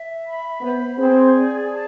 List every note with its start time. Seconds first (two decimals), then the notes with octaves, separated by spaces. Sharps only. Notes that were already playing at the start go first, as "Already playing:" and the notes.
Already playing: E5
0.24 B5
0.61 B3 C5
0.98 C4 G#4
1.34 D5
1.71 A5